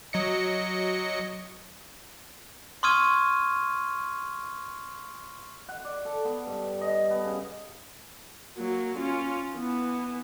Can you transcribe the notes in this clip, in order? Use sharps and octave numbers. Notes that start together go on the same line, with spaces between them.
F#3 D#5 C#7
C6 C#6 D#6 F6 G#6 D#7
F#5
D5
A4
B3
G2
D#5
B3
C#3
F#3 A#3
C#4 F4
E3 B3